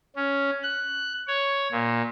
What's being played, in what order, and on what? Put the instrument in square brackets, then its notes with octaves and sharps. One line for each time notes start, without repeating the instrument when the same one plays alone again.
[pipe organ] C#4
F#6
C#5
A#2